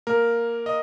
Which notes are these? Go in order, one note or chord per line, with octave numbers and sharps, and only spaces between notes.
A#3 A#4
D#5